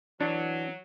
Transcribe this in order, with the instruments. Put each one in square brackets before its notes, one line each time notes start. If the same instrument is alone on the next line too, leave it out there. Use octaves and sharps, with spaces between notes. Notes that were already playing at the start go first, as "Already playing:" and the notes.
[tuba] E3 [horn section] F#3 [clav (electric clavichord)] D4